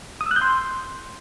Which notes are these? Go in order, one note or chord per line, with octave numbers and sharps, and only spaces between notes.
D#6
E6
F#6
G6
C6